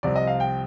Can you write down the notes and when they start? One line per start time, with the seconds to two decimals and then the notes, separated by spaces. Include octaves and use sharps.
0.03 C2 C3 F3 D5
0.16 D#5
0.27 F5
0.40 G5